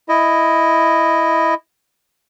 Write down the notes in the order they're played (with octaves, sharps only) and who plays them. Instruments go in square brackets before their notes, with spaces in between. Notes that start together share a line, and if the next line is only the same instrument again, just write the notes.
[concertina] E4 D#5